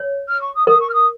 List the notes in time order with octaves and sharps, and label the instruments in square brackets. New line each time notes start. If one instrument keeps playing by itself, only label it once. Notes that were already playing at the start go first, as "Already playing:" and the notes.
Already playing: [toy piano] C#5
[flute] F6
C#6
D#6
[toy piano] A#4 [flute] D#6
[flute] C#6
F6
D#6